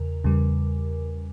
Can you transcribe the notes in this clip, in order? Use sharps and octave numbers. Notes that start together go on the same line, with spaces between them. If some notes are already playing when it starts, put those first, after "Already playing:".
Already playing: E2 C#3 A#4
E2 C#3 G3